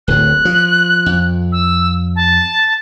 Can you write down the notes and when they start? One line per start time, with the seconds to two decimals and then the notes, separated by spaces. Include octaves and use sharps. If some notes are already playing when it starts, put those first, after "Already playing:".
0.08 D1 A2 F#6
0.45 F3
1.06 F2
1.52 E6
2.16 A5